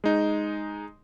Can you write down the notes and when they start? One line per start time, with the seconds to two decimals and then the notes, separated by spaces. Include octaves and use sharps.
0.04 G#3 D#4